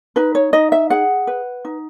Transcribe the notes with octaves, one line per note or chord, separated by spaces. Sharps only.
D#4 B4
C#5
D#4 D#5
E5
G#4 F#5
B4
D#4